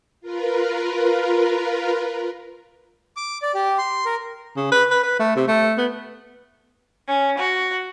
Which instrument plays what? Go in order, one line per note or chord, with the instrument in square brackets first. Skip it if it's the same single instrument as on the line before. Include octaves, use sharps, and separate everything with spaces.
[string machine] F4 A#4 B4
[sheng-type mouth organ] D6
D5
G4
C6
A#4
[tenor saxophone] C#3
B4
B4
B4
A3
C3
A3
B3
[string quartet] C#4
F#4